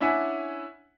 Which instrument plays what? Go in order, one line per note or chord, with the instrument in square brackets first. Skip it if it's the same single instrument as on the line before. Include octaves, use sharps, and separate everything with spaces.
[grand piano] C#4 D4 E4 E5 F#5 G#5